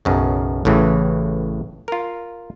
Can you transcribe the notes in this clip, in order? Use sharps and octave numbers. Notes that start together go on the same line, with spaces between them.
B1 F#2 C#3
A1 A2 C#3 E3
F4 A#4